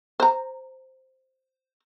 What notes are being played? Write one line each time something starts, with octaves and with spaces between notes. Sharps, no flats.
C5 A#5